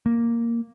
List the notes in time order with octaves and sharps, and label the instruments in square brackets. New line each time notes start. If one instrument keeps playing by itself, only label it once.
[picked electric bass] A#3